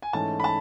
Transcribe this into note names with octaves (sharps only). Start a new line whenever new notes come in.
G#5
G#2 E3 A3 C#4 A5
B5
A5